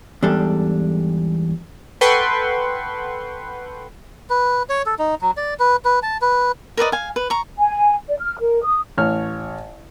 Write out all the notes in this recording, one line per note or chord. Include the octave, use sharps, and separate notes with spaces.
E2 G#2 G3 D4 A4
A4 B4 F#5 G5 C6 C#6
B4
C#5
A4
D#4
F#3
D5
B4
B4
A5
B4
A#4 B4 D5 D#5
F5 G#5
B4
A#5 C#6
G#5
D5
F6
A#4
D#6
A1 C#5 F6